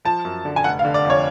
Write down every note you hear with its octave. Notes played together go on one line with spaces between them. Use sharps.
F3 A5
F#2
D3
G#5
F1 F#5
F5
D3
D5
F2
C#5